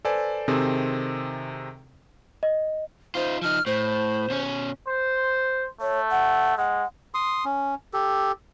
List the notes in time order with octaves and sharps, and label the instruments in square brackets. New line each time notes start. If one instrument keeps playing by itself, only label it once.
[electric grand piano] A4 B4 C5 D5 G#5
C3 D#3 C4 G#4 A4
[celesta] D#5
[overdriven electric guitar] D#4 F4 [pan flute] C5
[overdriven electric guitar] F3 D#4 [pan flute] F6
[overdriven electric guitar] A2 [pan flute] C5
[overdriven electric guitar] B2 C#4
[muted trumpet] C5
[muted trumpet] A3 [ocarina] C#5
[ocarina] F#5
[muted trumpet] G#3 [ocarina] F#5
[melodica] C6 D#6
C#4
G4 A4